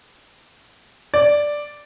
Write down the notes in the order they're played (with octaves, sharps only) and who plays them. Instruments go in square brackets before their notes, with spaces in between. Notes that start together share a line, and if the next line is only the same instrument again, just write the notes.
[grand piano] D5